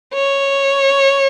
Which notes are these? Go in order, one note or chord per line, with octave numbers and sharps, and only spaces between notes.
C#5